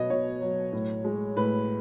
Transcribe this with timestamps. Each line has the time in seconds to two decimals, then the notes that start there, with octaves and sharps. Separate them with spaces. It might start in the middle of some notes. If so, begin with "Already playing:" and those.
Already playing: B2 F#3 B4 C#5 D#5
0.10 B2 C#5
0.41 F#3
0.72 A2
1.05 G#3
1.36 A2 B4